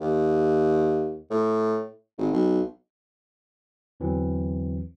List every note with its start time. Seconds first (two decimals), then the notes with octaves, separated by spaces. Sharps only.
0.01 D#2
1.30 A2
2.18 G#1
2.33 B1
4.00 E2 D3 E3 F#3 C4